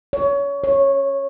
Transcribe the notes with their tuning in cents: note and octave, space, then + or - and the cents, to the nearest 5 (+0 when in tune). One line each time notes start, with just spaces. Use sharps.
C#5 +25
C#5 -10